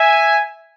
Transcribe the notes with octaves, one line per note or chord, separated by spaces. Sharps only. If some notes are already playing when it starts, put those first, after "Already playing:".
Already playing: E5 G#5